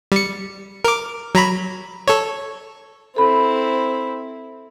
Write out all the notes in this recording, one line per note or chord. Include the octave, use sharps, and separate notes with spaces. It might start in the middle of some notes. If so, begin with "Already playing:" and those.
G3 C#7
A#4 D6
F#3 A#5 B5
A4 C#5
C4 E4 A4 B5